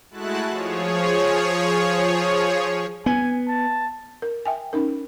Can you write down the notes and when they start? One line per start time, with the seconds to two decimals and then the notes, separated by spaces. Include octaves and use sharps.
0.11 G#3 A3 E4 F#4 A5 F#6
0.48 F3 G#4 C#5
3.06 B3 G#5
3.48 A5
4.22 A#4
4.45 E5 G5 G#5
4.73 C#4 D#4 A#4